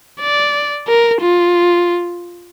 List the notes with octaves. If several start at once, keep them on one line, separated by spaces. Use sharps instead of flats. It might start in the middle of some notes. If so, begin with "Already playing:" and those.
D5
A#4
F4